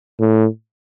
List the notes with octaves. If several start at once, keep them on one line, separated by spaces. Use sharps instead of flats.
A2